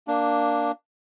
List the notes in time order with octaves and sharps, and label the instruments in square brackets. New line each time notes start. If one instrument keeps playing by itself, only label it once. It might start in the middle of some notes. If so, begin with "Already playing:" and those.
[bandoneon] A#3 D4